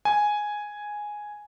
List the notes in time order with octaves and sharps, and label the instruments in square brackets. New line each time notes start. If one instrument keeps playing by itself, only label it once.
[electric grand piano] G#5